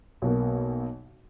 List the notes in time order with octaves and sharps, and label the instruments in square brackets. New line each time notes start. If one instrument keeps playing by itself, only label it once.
[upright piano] B1 B2 A#3